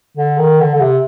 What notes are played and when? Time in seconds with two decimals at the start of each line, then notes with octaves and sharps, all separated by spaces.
0.17 D3
0.38 D#3
0.60 D3
0.75 D3
0.81 C3